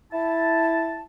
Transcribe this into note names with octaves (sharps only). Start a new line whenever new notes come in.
E4 A5